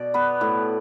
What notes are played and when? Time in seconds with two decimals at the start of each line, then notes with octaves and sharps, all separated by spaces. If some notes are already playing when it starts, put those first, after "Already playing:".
Already playing: B2 D5
0.14 B3 B4
0.41 A2